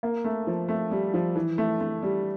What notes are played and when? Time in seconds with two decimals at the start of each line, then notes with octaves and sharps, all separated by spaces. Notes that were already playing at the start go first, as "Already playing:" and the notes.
0.03 A#3
0.24 A3
0.47 F3
0.69 A3
0.91 G3
1.14 F3
1.36 E3
1.58 A3
1.81 A3
2.03 G3